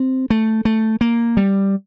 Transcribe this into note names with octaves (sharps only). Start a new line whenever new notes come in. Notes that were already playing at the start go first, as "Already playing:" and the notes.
Already playing: C4
A3
A3
A#3
G3